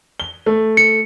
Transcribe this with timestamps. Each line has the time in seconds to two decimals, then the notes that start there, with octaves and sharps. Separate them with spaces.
0.20 G7
0.46 A3
0.77 C#7